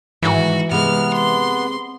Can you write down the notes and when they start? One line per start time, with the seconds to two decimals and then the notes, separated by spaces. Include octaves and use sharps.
0.23 G#2 D#3 E3 F#4
0.71 C3 G#3 B3 F6
1.14 C6